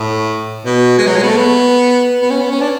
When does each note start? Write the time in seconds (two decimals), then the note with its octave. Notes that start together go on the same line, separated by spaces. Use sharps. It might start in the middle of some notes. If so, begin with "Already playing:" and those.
Already playing: A2
0.65 B2
0.98 G#3
1.07 F#3
1.16 G#3
1.23 B3
1.28 A3
1.37 B3
2.22 B3
2.30 C#4
2.40 B3
2.52 C#4
2.61 D4